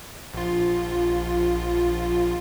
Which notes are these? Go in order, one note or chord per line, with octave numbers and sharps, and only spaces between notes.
A#1 F4